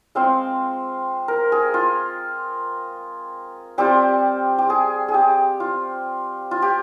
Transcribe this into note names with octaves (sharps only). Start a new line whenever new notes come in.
G#3 C4 F4 F5
A#4
G#4
F4
G3 C4 F4 G4
G4
G#4
G#4
G4
F4
F4
G4